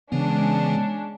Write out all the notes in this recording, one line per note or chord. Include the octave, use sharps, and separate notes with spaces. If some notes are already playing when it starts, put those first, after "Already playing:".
C#3 E3 G#3 B3 C#4 D4